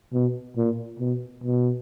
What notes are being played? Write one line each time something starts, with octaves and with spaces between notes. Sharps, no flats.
B2
A#2
B2
B2